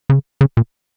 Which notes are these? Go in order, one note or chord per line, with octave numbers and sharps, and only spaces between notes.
C#3
C#3
A#2